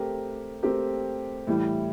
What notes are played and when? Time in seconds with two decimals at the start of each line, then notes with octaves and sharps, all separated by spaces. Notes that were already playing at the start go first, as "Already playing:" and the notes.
Already playing: A3 C4 G4 A#4
0.63 A3 C4 G4 A#4
1.47 A2 E3 G3